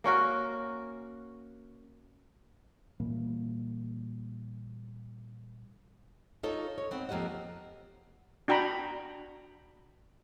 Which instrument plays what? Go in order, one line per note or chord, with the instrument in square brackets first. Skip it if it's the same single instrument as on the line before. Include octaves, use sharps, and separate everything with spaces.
[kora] A#3 C#4 F#4 A#4
[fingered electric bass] A#2 E3 G3 A#3
[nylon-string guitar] D#4 F4 A4 C#5 D#5
C#5
B3 C4
F2 A#3 G4 D#5 F#5
[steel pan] D4 F#4 G5 A#5 B5